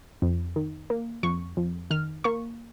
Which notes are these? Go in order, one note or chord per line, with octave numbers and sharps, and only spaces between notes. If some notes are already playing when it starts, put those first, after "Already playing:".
F2
D#3
A#3
F2 C#6
F2
D#3 F6
A#3 C#6